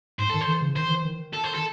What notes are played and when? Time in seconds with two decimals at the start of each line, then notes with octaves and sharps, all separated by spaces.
0.19 G#2 C5
0.30 D#3 A4
0.41 C5
0.48 E3
0.61 C#3
0.76 D#3 C5
0.90 E3
1.05 D#3
1.33 A4
1.44 C5
1.54 A4